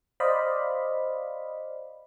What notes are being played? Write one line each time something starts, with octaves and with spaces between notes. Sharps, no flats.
C5 D5 D#5 F5 B5